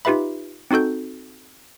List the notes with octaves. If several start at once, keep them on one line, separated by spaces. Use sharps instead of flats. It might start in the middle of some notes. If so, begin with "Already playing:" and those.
D#4 F4 G4 B4 E5 B5
C4 D#4 F#4 A4 G6